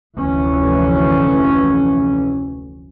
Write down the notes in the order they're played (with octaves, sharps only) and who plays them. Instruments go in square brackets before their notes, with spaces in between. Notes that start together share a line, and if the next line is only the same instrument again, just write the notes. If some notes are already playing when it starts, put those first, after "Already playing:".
[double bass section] F1 D2 E3 C#4